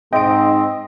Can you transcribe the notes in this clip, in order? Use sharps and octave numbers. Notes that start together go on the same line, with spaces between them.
G#2 C4 D#5 G5 D7